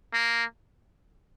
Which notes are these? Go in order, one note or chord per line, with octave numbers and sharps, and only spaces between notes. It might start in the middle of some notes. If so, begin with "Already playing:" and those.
A#3